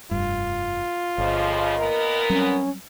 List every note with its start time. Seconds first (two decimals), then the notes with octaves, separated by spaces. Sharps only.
0.11 F1 G2 F4
1.18 G1 F2 C#3 F3 D#5
1.78 A#2 B3 A#4
2.30 F#3 G3 C4 C#4